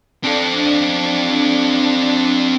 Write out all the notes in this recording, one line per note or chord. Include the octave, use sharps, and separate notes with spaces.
C4 D4 A4